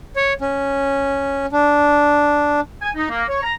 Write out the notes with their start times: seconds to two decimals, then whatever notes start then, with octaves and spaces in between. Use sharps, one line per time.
0.16 C#5
0.41 C#4
1.52 D4
2.82 G#5
2.96 D#4
3.10 A#3
3.29 C#5
3.43 A#5